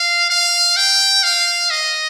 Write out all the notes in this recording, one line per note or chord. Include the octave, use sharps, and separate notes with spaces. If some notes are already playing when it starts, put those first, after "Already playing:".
Already playing: F5
F5
G5
F5
D#5